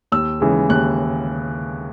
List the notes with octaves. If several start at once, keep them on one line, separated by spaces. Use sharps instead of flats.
D#2 E6
C#3 E3 G#3
D#2 F#6